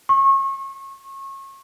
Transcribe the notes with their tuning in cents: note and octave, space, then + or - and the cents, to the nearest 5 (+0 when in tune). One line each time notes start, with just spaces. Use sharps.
C#6 -30